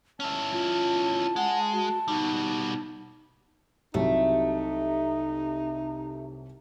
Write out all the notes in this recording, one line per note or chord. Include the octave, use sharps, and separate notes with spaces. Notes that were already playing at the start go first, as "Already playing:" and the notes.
C#4 E4 A5
F4
G#3 F#5
F#4
B2 G3 D#4
C2 C3 F#3 A3 D#4